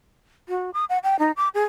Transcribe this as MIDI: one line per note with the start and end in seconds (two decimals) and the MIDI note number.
0.49 0.70 66
0.74 0.85 87
0.89 0.98 78
1.04 1.18 79
1.19 1.32 63
1.37 1.49 86
1.54 1.63 68